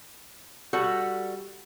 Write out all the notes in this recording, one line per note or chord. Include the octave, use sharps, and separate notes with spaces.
G3 F#4 A4 F#5